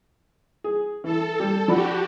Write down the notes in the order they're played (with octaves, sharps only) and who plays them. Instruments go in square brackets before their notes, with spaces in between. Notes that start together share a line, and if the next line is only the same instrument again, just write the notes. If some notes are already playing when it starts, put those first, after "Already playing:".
[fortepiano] G#4
[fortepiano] E3 [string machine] A4
[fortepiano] G3
[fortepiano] F3 D5 B5 [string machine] F#4 G4